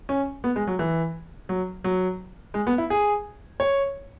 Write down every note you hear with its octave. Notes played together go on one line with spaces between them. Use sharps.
C#4
B3
G#3
F#3
E3
F#3
F#3
G#3
B3
E4
G#4
C#5